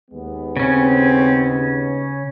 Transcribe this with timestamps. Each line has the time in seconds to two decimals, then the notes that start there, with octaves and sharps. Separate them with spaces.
0.10 D#2 G#3 B3
0.57 C#3 C4 C#4